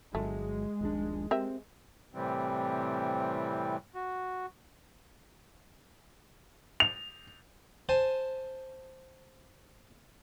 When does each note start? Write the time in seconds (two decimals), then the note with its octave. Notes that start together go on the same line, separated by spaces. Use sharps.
0.15 G1 F#3 G#3 A3
0.81 D#1 A#1 D4
1.31 C4 G4 A#4 E5
2.14 A2 C3 E3 G3 C4
3.95 F#4
6.80 F7
7.89 C5 G#5 A5